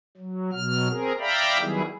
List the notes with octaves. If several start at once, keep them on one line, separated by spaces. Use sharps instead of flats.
F#3
B2 F#3 F6
C4 G#4 A#4
D5 E5 F5 G5 A#5 B5
D#3 F#3 G3 B3 E4 G#4